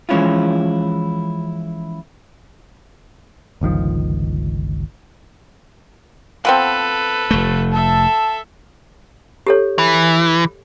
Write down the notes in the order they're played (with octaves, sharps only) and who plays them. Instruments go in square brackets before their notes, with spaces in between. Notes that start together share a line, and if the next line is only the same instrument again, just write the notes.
[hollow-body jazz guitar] E3 F3 G#3 C#4 E4 F4
[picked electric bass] G1 C#2 D#3 F3
[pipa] F3 B3 C4 [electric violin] A4 B4
[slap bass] F1 A3
[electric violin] A4 E5 [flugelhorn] A5
[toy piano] G4 A4 C#5
[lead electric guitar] E3